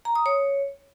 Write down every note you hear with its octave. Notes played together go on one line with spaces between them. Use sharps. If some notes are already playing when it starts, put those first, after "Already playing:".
A#5
D#6
C#5